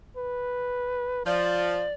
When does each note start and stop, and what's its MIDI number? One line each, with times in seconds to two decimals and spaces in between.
0.17 1.24 71
1.26 1.84 53
1.26 1.71 65
1.26 1.93 74